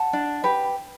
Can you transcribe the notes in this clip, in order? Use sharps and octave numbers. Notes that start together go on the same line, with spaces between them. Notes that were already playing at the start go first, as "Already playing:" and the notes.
Already playing: F#5 A5
D4
G4 B4